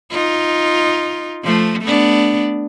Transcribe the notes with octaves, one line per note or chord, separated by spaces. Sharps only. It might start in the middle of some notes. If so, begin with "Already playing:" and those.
D#4 F4
F3 A3
A3 B3 D4